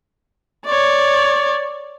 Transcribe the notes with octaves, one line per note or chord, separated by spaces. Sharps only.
C#5 D5